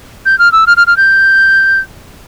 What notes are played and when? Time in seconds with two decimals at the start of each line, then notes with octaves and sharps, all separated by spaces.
0.26 G6
0.39 F6
0.52 E6
0.67 F6
0.77 F6
0.87 F6
0.97 G6